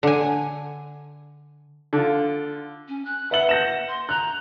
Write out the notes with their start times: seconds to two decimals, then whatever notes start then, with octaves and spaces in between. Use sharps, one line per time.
0.03 D3 G#5
1.93 D3 F4
2.88 C#4
3.05 F#6
3.31 B4 E5 F#5 F#7
3.49 G6 A#6 E7
3.88 C6
4.09 A#5 F#6